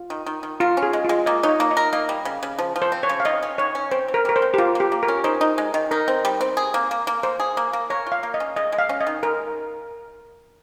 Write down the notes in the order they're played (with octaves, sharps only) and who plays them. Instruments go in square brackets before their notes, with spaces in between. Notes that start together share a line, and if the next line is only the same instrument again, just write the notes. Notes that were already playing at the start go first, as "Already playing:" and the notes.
Already playing: [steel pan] F4
[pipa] D#3
D#3
D#3
[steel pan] F4 [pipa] A#4
[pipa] C#4
[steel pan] G#4
[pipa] G#3
[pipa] G#3 [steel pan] F4
[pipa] A#3 [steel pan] D#5
[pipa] D#4 [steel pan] C#5
[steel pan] D#5
[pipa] A#3
[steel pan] D#5
[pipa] A#4
[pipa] A#3 [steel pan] D#5
[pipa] G3
C#3
C#3
F3
F3
[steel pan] C5
[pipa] C4
[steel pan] C#5
[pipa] C#3
[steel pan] F5
[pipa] D#3 [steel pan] D#5
[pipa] C#4
[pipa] D#3 [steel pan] C#5
[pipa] C#4
[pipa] C4 [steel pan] C5
[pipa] C4
[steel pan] A#4
[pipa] G3 [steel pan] A#4
[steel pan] C5
[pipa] C4
[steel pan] G4
[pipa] A#3 [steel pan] F4
[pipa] A#3 [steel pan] G4
[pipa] A#3
[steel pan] A#4
[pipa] C#4
[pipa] D#4 [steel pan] C5
[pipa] D#4
G#3
D#3
[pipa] D#4 [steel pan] A#4
[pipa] C4
G3
C4
G#4
A#3
A#3
A#3
[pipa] A#3 [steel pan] C5
[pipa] G#4
A#3
A#3
[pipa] A#4 [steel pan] C#5
[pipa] F4
[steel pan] F5
[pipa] A#3
[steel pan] D#5
[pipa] C#4
[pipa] G#3 [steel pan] D#5
[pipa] G#3
[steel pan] F5
[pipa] C#4
[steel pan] D#5
[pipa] D#3
[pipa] G#3 [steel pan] A#4